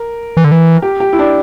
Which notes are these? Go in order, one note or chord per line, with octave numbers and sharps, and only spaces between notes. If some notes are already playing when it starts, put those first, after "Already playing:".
Already playing: A#4
E3
D3
E3
G4
G4
E4
D4